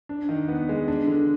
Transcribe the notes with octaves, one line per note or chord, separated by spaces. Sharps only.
D4
D#3
B3
G#3
D4
D3